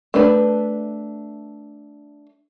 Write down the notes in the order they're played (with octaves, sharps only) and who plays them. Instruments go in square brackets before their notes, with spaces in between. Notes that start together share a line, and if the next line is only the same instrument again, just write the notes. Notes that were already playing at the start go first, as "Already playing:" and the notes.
[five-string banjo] A3 D4 B4